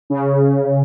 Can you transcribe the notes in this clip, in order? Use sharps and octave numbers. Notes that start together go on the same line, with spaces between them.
C#3